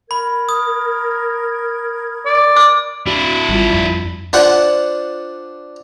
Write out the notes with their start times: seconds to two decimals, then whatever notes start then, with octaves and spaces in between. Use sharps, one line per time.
0.11 A#4 B5 G#6
0.49 D#6
2.25 D5
2.56 D6
3.07 D4 E4 F#4 B5
3.49 G#1 G3 F4
3.73 F2
4.33 D4 F4 C5 F#5